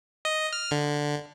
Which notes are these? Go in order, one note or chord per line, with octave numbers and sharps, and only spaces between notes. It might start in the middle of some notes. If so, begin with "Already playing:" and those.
D#5
F6
D3